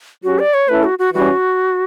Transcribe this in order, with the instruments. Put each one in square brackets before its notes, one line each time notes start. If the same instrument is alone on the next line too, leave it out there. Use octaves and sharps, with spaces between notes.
[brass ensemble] F#3 C#4 G4 [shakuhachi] F#4
[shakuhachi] D5
C#5
[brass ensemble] A3 C#4 E4 A4 [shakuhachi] B4
[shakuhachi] F#4
F#4
[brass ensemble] E3 G3 C#4 [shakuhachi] F#4